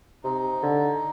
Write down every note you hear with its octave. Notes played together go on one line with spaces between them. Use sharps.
C3 D#4
D3